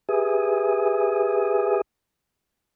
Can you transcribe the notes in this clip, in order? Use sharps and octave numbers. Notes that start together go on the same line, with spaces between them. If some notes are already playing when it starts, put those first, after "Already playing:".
G4 G#4 B4 E5 G#5 D#6